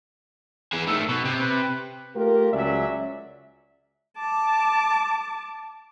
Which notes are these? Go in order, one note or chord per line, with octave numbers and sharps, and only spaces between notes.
E3 G#4
D#3 A3 E6
B2 B3
C3
B4
A3 A#3 F4 G4 A#4
C#2 F#3 C#4 D5 E5
A5 D6